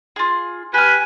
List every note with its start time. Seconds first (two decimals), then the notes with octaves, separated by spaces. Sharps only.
0.16 F4 G#4
0.74 G4 B4 G#5 F6